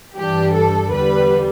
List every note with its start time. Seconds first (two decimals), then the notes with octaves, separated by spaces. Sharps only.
0.17 G2 E3 G3 D4 G4
0.54 A4
0.93 E2 D3 G3 B4